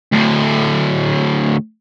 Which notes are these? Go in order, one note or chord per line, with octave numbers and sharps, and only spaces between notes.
D2 A2